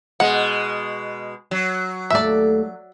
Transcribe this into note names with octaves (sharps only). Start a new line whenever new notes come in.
B2 G#3 F#5
F#3
D#2 A3 A4 D5 E5